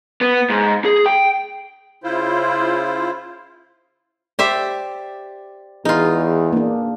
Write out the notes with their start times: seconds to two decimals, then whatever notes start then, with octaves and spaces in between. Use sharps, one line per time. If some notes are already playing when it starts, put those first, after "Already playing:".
0.21 B3
0.50 G#2
0.85 G#4
1.06 G5
2.04 C#3 E4 F4 C5
4.39 G4 C5 D5 E5
5.85 E2 D#4 F4 G#4
6.52 A#3 D4